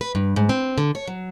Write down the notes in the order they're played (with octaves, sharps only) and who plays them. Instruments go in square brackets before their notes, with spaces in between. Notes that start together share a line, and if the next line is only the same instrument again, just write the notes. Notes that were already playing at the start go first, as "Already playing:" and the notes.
[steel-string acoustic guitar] B4
G2
G#2
C4
D3
C#5
F#3